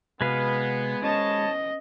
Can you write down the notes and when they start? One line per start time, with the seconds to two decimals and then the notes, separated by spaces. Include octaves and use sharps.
0.21 C3 G#3 B3 F#4 B4 F5
1.03 C#4 A#4 C5 C#5 D#5 A5